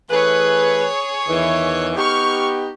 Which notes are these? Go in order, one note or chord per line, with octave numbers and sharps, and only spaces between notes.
E3 A3 G#4 B4 C#5
E2 D#3 E3
B3 D#4 G4 C#6 F6